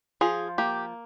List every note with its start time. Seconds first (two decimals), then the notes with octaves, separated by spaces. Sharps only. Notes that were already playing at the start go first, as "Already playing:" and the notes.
0.21 F3 F4 G#4
0.58 A#3 G4